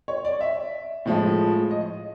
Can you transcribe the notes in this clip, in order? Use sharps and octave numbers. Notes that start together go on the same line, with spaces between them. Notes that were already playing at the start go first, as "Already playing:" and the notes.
C#5
D5
E5
A2 F3 G#3
D#5